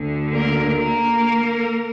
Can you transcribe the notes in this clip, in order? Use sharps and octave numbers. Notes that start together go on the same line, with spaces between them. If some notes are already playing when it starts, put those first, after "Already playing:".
Already playing: D2 D3
A#3 A#4
A#3 A#4